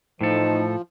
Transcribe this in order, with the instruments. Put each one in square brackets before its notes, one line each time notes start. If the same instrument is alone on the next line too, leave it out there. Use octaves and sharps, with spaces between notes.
[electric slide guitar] A2 A4 [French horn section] E3 A3 D#4 [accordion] F3